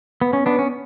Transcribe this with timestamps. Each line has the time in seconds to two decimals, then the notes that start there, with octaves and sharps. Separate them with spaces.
0.22 B3
0.33 C#4
0.46 B3 D4
0.59 C#4